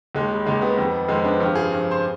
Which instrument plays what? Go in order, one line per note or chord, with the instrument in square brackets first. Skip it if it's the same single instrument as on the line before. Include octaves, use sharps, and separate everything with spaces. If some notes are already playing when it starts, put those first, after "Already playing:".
[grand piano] D#2 D#3 G#3
G3
D#2 D#3 G#3
G3 B3
F2 D#3
F2 D#3 G#3 C4
B3 D4
G2 F3
G4
F4 G#4
G2 F3
C5